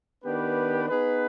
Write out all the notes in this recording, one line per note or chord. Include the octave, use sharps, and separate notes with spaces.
D#3 B3 D4 G4 B4
B3 D#4 G#4 B4